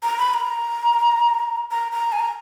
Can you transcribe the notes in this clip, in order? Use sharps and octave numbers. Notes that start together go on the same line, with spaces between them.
A#5
B5
A#5
A#5
A#5
G#5
A#5